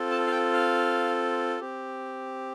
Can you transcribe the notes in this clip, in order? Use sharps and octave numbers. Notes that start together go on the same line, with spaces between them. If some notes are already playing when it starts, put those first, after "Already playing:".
Already playing: C4 F4 A4
A5
F5
G5
F5
C4 G4